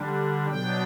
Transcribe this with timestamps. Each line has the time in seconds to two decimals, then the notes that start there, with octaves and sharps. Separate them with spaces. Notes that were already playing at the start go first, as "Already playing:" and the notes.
Already playing: D3 G3 D4
0.48 B2 F#3 B3 D4 G5